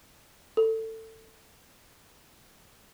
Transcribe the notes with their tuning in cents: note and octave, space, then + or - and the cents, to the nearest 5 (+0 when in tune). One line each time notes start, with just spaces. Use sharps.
A4 +20